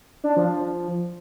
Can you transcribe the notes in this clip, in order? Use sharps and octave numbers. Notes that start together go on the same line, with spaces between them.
D4
F3